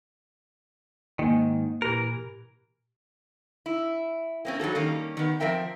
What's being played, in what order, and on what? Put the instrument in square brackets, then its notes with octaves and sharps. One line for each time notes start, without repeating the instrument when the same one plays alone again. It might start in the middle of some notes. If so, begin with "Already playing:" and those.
[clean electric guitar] G#2 D#3 [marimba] A#3 G#5
[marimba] A#2 G4 [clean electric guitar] E3 A#4
[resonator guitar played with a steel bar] E4
A#3 C4 C#4
F#3 G3 F#4 A4
D#3 G3 A#3 C#4
D#3 B3
F3 C4 A#4 E5 G5